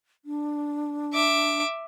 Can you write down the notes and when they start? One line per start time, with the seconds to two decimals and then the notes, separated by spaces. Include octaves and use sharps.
0.25 D4
1.13 E5 D6